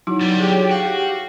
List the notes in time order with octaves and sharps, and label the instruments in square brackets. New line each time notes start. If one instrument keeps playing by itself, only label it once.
[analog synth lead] F#3 [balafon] D#4 E4 F#4
[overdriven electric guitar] G3 B3
[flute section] G4 G5 [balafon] G#4 C#5
[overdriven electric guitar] F#4 [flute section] F5
[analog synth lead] G4